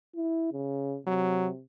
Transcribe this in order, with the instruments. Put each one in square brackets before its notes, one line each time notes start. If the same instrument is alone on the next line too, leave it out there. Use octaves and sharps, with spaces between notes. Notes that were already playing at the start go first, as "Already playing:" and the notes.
[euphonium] E4
C#3
[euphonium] C3 [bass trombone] F#3